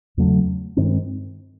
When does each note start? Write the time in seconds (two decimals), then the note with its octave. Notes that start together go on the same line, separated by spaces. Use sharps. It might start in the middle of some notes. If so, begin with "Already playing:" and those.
0.17 E2 C#3 F#3 A3
0.77 G2 D#3 G#3 C4